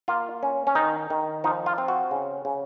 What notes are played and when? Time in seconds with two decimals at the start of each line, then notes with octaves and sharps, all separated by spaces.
0.08 A#3 F4
0.43 C#4
0.67 C#4
0.75 D#3 D#4
1.10 D#3
1.44 F3 D#4
1.66 F4
1.78 C4
1.88 F#4
2.11 C#3
2.45 C#3